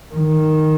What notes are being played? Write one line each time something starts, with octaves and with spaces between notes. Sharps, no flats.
D#3